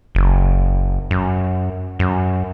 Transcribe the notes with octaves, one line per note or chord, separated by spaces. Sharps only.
F#1
F#2
F#2